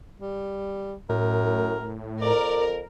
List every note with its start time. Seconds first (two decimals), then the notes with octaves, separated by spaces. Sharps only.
0.20 G3
1.09 F#2 A2 A#4
2.22 F2 A#4 D5